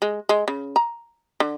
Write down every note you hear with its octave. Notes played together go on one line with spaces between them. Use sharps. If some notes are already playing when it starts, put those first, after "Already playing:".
G#3
G#3
C#3
A#5
D3